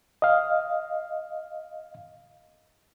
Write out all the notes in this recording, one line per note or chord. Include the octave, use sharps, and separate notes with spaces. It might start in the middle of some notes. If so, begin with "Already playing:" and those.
D#5 F5